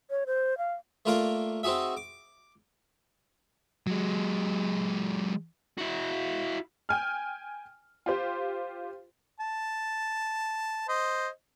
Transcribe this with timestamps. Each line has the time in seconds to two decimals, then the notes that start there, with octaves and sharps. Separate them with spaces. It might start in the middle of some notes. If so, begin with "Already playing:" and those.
0.10 C#5
0.27 C5
0.58 F5
1.05 A3 A#3 F4 A#4 D5 F5
1.63 C4 D#4 F#4 G#4 E5
1.97 D6
3.87 F#3 G#3
5.78 E4 F#4
6.89 G5 G#5 F6
8.06 F4 G4 C5
9.40 A5
10.88 C5 D#5